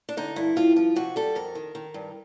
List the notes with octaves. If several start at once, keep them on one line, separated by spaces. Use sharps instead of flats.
D4
D3 D#4
G2 E4
G2 F4
F3 F4
C3 F#4
G3 A4
F2 A#4
D#3
D#3
G2